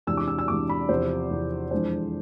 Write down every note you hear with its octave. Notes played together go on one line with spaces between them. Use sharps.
E2 C3 E3 G#3 D4 E6
D6
E6
E6
E2 C3 E3 G#3 D4 D6
B5
E2 C3 F3 C5
E2 C3 F3
F2 E3 G#3 D4 C5